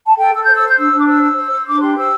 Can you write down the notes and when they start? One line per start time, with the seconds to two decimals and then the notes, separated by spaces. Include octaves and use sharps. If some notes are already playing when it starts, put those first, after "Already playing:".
0.07 A5
0.17 A4 G5
0.32 A4 E6
0.43 C5 G6
0.55 E6
0.62 C5 G6
0.77 D4 E6
0.91 D4
1.00 D6
1.07 C5 E6
1.21 C5
1.36 C5
1.51 C5
1.66 D4 D6
1.81 G4 C6
1.96 C5 E6